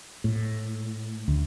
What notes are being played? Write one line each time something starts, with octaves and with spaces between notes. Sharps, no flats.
A2
D2